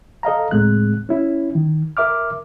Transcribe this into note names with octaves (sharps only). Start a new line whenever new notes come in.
A4 D#5 F5 A#5
C#2 A2 G#3 C4 F#6
C#4 E4
D#3
A#4 E5 D6 F6